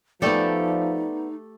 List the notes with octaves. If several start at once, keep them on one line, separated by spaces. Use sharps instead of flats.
F3 A3 B3 D#4 G4 A4 D5